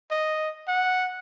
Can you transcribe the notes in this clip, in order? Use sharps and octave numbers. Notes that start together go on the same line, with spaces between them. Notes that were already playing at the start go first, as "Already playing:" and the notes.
D#5
F#5